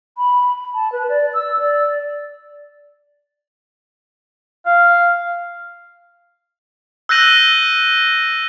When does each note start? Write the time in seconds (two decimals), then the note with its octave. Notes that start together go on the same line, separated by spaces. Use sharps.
0.18 B5
0.75 A5
0.92 B4
1.09 D5
1.34 E6
1.58 D5
4.66 F5
7.09 E6 F#6 G6 A#6 D#7 F#7